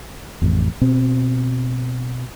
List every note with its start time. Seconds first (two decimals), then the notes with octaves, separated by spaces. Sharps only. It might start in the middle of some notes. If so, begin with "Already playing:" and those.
0.42 A1 F2
0.81 B2 C4